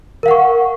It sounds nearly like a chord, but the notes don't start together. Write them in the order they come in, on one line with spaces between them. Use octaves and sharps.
A#4 F5 F#5 C#6